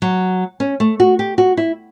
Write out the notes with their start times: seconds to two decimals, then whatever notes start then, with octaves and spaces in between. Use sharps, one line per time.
0.02 F#3
0.60 C#4
0.80 A3
1.00 F#4
1.19 G4
1.38 F#4
1.57 E4